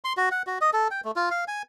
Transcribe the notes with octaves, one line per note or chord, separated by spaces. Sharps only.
C6
F#4
F#5
F#4
D#5
A4
G5
A3
F4
F5
G#5